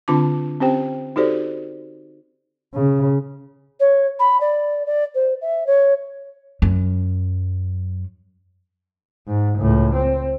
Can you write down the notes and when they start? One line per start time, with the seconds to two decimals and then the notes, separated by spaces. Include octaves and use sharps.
0.08 D3 C4 D4 F4 A5 D6
0.60 C4 C#4 G4 C5 G5
1.16 D#4 F#4 G4 A4 C5 D5
2.74 C#3
3.80 C#5
4.19 B5
4.40 D5
4.86 D5
5.15 C5
5.41 E5
5.67 C#5
6.62 F#2
9.27 G#2
9.58 C#2 A2
9.95 C4